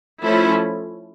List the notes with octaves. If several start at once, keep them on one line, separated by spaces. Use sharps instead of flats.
F3 A3 C#4 E4 A4